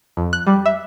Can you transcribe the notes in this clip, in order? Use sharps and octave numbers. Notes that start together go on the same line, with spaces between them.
F2
F#6
G3
E5